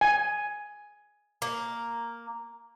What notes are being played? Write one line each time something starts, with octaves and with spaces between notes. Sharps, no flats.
G#5
A#3